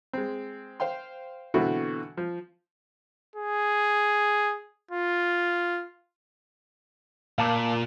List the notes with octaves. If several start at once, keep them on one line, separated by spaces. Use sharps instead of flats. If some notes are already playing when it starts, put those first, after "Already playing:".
G#3 C4
C5 F5 G5 C6
B2 D3 E3 B3 C4 F#4
F3
G#4
F4
A#2 F5 A5 D6